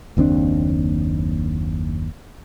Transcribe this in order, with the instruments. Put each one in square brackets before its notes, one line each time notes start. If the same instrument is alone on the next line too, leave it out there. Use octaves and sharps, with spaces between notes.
[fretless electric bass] F#1 D#2 C4 D4